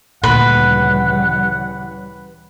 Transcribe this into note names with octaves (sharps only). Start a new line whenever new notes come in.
D2 A#2 C#3 E3 G3 B4 F#5